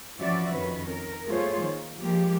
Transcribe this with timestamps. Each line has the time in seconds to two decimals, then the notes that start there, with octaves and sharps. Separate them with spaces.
0.19 E3 F3 C#4 F#4 D5 E5
0.53 F2 D#3 C#4 B4
0.87 A#4
1.25 A3 A#3 F4 G#4 C5 C#5
1.61 D#3
1.99 F3 G#3 A#3 G4